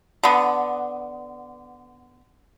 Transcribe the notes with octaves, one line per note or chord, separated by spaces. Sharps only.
D3 B3